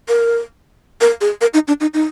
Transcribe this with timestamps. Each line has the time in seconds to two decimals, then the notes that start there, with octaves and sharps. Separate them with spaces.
0.08 A#4
1.01 A#4
1.21 G#4
1.41 A#4
1.54 D#4
1.68 D4
1.81 D#4
1.94 D#4